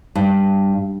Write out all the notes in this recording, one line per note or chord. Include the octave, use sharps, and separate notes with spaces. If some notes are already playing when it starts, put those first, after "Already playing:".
G2